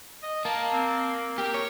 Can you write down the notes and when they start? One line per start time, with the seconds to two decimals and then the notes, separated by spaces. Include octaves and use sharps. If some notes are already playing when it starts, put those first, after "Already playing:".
0.23 D#5
0.45 A#3 A5
0.73 C4
1.38 G4 A#4
1.54 C#5